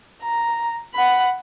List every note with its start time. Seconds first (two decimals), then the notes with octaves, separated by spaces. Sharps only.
0.23 A#5
0.94 F#5 B5